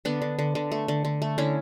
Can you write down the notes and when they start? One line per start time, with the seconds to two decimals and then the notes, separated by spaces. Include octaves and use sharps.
0.05 D3 B3 D4
0.22 D3
0.39 D3
0.55 D3
0.72 A3
0.88 D3
1.05 D3
1.22 A3
1.38 D3 C#4 E4